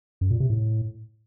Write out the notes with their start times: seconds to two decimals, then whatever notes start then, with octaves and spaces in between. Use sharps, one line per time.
0.21 F#2
0.31 A#2
0.40 C3
0.50 A2